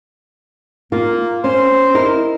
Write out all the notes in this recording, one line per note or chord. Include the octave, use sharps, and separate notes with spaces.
A#3 F4 A#4
C#4 C5
D#4 E4 A#4